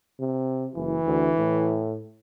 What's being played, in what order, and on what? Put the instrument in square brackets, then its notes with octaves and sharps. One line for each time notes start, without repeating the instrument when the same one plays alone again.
[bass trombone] C3
[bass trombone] F#1 [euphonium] E3
[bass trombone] D2
A2